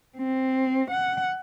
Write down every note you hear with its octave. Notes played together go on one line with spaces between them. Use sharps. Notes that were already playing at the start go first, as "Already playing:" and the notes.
C4
F#5